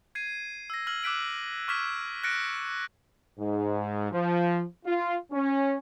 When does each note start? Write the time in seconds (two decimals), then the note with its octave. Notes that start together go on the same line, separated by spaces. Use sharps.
0.15 G#6 C7 D#7
0.70 E6 A#6
0.87 E6 F6 G#6 F#7
1.03 D6 E6 F#6 B6 D7 F#7
1.68 C#6 D6 F6 G#6 B6 E7
2.23 F6 F#6 A6 A#6 C#7 D7
3.39 G#2
4.12 F3
4.86 F4
5.31 C#4